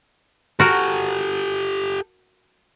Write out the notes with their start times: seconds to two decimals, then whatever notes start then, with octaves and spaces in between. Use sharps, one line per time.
0.60 F#4 G4 A4 A#4